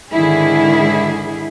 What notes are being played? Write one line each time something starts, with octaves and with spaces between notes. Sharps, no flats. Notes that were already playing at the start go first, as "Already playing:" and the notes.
G#2 D3 D#3 E4 G#4